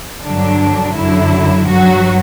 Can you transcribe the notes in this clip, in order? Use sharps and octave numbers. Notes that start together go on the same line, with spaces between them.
G2 D3 F#3 D4
F#2 D3 F#3 E4
G2 F#3 F#4